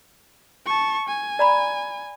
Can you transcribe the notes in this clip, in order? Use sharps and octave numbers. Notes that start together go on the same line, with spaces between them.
A5 C#6
G#5
D5 A#5 B5